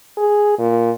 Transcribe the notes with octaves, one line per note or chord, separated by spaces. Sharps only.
G#4
A#2